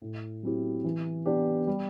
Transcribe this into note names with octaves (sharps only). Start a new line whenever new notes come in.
A2
F#3 C4 E4 G4
E3
B3 D4 G4
G3